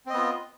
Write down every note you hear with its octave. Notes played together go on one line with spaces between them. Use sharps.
B3 C4 F4 D#5